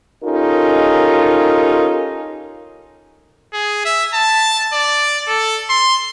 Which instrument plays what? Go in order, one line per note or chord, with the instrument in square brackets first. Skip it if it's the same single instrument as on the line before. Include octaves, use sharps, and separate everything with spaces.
[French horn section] C#4 D#4 F4 G4 A4 A#4
[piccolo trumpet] G#4
E5
A5
D5
A4
C6